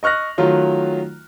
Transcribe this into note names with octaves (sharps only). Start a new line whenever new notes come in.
D#5 C#6 F6 F#6 A#6
D#3 F#3 A3 F4